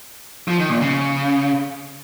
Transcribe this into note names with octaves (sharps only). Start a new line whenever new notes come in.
F3
D#3
A#2
C#3